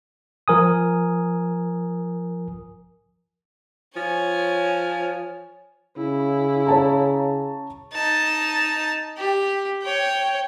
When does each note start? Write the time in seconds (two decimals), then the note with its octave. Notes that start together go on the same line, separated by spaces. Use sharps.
0.48 F3 A#4 G#5 D#6
3.96 F3 C#5 G#5
5.97 C#3 E4
6.66 C#5 A5 A#5
7.93 D#4 A5
9.17 G4
9.82 C#5 G5